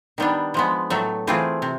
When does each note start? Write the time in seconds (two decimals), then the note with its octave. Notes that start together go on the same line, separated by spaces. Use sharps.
0.18 D#3 G3 B3 D4
0.54 F3 G#3 B3
0.90 A2 F#3 A3
1.27 E3 A3 C4 F4 G#4
1.62 C3